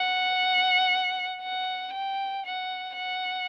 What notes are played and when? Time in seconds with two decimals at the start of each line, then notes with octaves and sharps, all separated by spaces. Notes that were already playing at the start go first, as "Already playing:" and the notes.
Already playing: F#5
1.42 F#5
1.93 G5
2.46 F#5
2.96 F#5